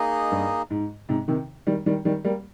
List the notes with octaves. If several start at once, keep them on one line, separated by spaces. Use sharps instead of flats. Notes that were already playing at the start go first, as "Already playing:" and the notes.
Already playing: A#3 D#4 G#4 D#5
G2
G#2
G#2 C3
C3 D#3
D#3 G3
D#3 G3
D#3 G3
G3 A#3